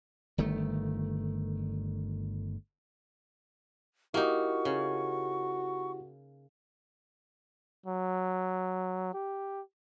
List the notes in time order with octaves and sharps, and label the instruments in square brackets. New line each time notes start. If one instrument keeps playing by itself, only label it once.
[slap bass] G1 D#3 A3
[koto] A#3 D#4 [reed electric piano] E4 G4 [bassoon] F#4 [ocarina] C#6
[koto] C#3
[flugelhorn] F#3
G4